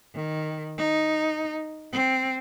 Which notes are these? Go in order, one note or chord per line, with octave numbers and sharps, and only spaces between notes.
D#3
D#4
C4